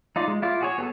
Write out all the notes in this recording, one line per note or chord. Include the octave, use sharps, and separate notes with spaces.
D#4 F4 D5
G#3
E4 F4 D5
F#4 G#4 C#5
B3 G#4 A4